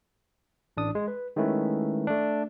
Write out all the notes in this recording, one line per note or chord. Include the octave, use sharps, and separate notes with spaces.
A1 D4 D#6
G#3
B4
D#3 G#3 A3 C#4 E4 B4
A3 D4